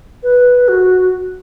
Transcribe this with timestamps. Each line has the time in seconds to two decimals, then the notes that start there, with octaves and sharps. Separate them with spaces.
0.23 B4
0.68 F#4